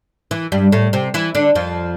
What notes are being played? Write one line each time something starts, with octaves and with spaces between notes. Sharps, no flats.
E3
G2 G3
A2 A3
C3 C4
E3 E4
D3 D4
F2 F3